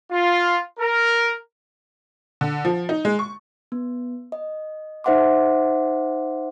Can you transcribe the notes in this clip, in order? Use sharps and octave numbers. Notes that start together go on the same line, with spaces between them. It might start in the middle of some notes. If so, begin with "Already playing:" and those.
F4
A#4
D3
F3
D#4
G#3
C#6
B3
D#5
D#4 C5 E5 F#5 C6 D6